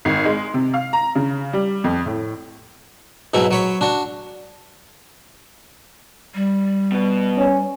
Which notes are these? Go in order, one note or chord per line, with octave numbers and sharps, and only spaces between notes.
G#1
G#3
C3
F5
A#5
C#3
G3
F2
A2
G#2 B2 F#3 E4
F#3 C#5 B5
D4 F#4
G3
B2 B3
C#4